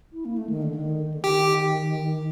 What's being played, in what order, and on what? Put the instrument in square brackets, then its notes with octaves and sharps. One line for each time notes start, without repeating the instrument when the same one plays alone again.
[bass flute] E4
A#3
A3
D#3
D3
D#3
D3
[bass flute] D#3 [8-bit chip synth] G4